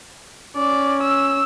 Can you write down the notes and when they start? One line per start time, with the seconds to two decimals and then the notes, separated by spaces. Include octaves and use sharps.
0.57 C#4 D5
1.03 E6